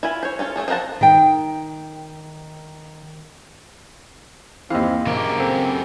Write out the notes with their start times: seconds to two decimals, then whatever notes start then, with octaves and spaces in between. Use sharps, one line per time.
0.03 E4 F4 G#5 B5
0.23 C5 C#5
0.39 C#4 F4 A4 C#5
0.56 A3 D#4 G#4 A4
0.68 F3 F4 A#4 F#5 A5
1.01 D#3 G5
4.70 D#2 E3 C4 D#5 F5
5.06 A#1 C#3 F#3 A#3 G4
5.40 C4 A4